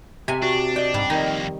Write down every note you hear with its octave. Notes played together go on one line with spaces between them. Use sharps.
C3 C4 G4 E5 G#5
D4 F#4
D5 D#5 G5
G#2 G3
F2 D#3 A#3 D#4